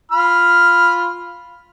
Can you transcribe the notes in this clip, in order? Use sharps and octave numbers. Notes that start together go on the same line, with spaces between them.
F4 B5 F6